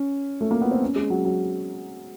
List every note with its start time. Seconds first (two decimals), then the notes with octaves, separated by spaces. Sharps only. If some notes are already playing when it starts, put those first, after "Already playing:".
Already playing: C#4
0.41 A3
0.51 A#3
0.61 B3
0.71 C4
0.82 C#4
0.96 G#3
1.10 F#3
1.25 F#3